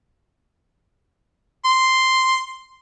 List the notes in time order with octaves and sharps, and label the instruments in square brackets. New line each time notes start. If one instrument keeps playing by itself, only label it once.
[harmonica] C6